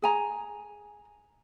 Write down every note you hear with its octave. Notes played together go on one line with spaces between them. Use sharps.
G#4 G#5 A#5